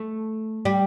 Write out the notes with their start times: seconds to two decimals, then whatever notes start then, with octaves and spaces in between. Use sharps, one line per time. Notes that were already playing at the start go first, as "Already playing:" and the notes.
Already playing: A3
0.65 G3